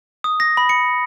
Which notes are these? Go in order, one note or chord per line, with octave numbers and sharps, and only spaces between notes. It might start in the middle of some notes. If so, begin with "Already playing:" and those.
D#6
A#6
B5
C#7